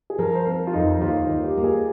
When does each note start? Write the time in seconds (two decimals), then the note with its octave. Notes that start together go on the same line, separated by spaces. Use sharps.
0.10 G#4
0.18 F3 A#4
0.35 C5
0.47 C4 A#4
0.67 F4
0.74 F2 D#4
1.01 D#2 F4
1.23 D#4
1.30 D#2
1.44 G4
1.57 A#3
1.64 G#4